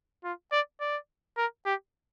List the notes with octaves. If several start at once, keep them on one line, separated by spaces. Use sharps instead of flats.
F4
D5
D5
A#4
G4